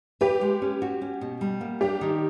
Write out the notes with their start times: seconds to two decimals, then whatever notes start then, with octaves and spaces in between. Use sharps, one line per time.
0.21 G4 B4
0.41 G#3
0.62 C#4
0.82 F#4
1.01 C#4
1.21 B2
1.41 G3
1.61 A#3
1.81 D4 G4
2.01 D#3